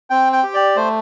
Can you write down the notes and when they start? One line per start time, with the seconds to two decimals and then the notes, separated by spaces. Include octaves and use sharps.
0.10 C4 G5
0.32 G5
0.43 G4
0.54 D5
0.76 A3 C5